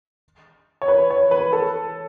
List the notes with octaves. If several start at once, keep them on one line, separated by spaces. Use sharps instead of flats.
C#5
B4
C#5
B4
A4